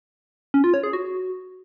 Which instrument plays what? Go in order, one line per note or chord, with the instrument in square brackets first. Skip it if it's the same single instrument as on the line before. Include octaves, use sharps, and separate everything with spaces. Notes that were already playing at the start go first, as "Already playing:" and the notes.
[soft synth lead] C#4
F4
C#5
G#4
F#4